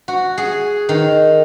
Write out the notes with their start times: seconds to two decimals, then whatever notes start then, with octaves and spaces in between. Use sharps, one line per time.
0.08 F#4
0.38 G#4
0.89 D#3